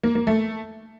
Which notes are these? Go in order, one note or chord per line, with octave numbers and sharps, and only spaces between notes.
A#3
A#3
A3